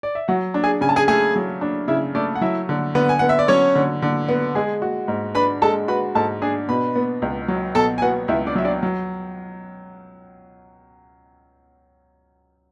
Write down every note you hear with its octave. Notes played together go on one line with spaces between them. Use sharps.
D5
E5
F#3 F#4 F#5
D4
G#4 G#5
C#3 G#5
A5
G#4 G#5
A3 G#4 G#5
F#3
D4
C#3 E4 E5
A3 D4 D5
F#5
F#3 E4 E5
D3
D3 B3 B4
G#5
B3 F#5
E5
D5
F#3 C#4 C#5
D3
D3
B3
G#3 G#4 G#5
F#4
G#2
D4 B4 B5
G#3 A4 A5
F#4 B4 B5
G#2 A4 A5
D4 G#4 G#5
B2 B4 B5
B3
C#2
F#3
B2 A4 A5
G#5
B3 F#4 F#5
C#2 E4 E5
D4 D5
F#3 E5
D4 D5
F#3